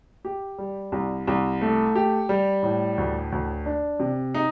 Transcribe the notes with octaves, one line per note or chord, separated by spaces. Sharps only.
G4
G3
C2
C2
A3
G4
G3
A2
D2
D2
D4
C3
D#4